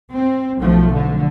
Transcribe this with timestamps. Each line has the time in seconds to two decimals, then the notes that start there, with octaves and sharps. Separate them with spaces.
0.15 C4
0.60 B1 F3 A3
0.94 D3